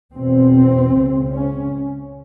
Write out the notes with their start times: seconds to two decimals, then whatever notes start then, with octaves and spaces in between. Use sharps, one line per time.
0.13 E2 B2 C4
0.93 C#2 C#3
1.33 C#4